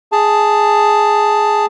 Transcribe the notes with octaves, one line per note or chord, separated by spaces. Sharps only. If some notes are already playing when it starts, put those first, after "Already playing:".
G#4 A5